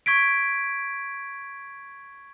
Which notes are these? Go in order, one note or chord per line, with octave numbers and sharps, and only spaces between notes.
C#6 G#6 B6 D7